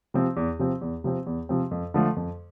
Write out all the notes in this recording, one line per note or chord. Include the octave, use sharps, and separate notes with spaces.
C3 F3 C4
E2
C3 F3 C4
E2
C3 F3 C4
E2
C3 F3 C4
F2
D3 F3 A3
F2